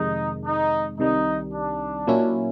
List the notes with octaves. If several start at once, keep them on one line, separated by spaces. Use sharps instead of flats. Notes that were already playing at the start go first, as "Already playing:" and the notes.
Already playing: F2 C3 D#3 G#3 D#4
D#4
C2 C3 D#3 G3 D#4
D4
A#2 F#3 A#3 C#4 E4